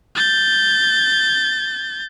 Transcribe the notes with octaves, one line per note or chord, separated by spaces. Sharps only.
G6 A6